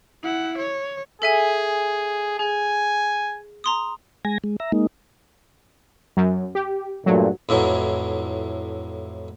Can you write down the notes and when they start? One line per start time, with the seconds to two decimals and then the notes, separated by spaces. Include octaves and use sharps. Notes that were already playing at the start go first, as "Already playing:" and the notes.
0.23 E4 F#5
0.58 C#5
1.22 G#4 A4 E5 G#5
2.39 G#4 G#5
3.64 A#5 C6 D#6
4.25 G#3 G#5 A#6
4.44 G#3
4.60 E5 A#5
4.72 G#3 A#3 D#4
6.17 F#2
6.55 G4
7.06 G2 A#2 F#3 A3
7.49 F2 A2 E3 F#3